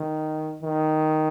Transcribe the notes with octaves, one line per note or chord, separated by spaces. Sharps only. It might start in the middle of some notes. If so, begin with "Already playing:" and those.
Already playing: D#3
D#3